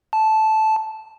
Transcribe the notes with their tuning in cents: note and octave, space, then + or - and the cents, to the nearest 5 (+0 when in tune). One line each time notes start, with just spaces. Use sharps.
A5 -10